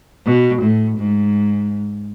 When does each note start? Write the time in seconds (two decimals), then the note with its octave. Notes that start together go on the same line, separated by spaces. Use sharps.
0.26 B2
0.62 A2
0.98 G#2